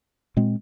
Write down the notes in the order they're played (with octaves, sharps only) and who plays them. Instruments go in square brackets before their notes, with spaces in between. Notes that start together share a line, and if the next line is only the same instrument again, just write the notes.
[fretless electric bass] A#2 G#3 C4